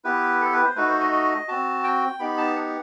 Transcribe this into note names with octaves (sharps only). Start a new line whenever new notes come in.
B3 E4 G4 B4
A4
B4
C5
A3 D#4 F#4 B4
C5
D#5
D#5
C4 F#4 A5
G5
B3 D#4 G4 B5
A5
F#5